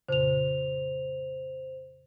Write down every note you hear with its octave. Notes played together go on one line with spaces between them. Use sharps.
F2 A#2 C#3 C5 F7